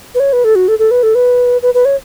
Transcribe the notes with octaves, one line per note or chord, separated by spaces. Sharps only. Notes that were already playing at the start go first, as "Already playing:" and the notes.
B4
C#5
B4
A4
F#4
A4
A4
B4
A4
B4
B4
B4
C#5